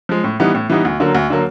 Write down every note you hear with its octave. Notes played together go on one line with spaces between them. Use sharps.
F3 G#3
A2
E3 G3 B3 D#4
A2
E3 G3 B3 D#4
D2
D3 F#3 A#3
D2
D3 F#3 A#3